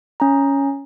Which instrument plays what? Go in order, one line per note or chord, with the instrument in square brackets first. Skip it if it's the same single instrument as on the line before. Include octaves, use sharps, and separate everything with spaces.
[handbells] C#4 A#5